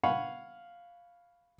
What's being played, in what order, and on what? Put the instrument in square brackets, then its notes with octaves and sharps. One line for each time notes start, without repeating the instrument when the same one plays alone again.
[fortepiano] F5 F#5 G#5 B5 C#6